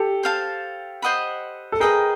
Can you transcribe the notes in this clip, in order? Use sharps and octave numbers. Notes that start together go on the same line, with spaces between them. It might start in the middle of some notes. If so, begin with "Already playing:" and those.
Already playing: G4 A4
C5 F5 A5
C5 D#5 F#5 B5
A4
G#4 A#4 B4 D#5 G5